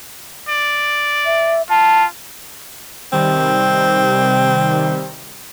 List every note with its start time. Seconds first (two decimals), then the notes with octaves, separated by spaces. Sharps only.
0.49 D5
1.26 E5
1.70 F4 A5
3.12 C3 D#3 G3 C4